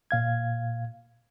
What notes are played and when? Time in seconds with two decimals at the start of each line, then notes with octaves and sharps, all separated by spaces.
0.11 A#2 F5 G#6